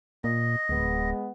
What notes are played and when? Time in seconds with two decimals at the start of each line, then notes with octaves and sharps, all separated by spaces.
0.24 A#2 D#5
0.69 D1 G#3 B3